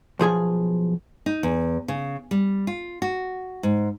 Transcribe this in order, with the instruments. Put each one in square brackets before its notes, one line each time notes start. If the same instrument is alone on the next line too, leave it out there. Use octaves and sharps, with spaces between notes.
[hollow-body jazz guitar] B1 F3 G#4 G#5
[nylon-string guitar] D#4
E2
C#3
G3
F4
F#4
G#2